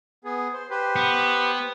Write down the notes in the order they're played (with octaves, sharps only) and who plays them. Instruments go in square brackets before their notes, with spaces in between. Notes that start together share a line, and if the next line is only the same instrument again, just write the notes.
[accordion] B3 G#4
C5
G4 B4 C5
[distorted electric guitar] B3